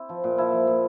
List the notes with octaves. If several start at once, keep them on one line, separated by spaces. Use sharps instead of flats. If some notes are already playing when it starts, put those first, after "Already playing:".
Already playing: C4 E4
F3
A#2
F3 E4
F3
A#2